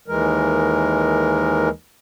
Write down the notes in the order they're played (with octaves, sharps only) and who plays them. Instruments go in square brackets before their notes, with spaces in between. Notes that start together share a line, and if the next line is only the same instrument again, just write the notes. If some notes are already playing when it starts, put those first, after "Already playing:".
[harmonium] D#2 E3 G#3 A#4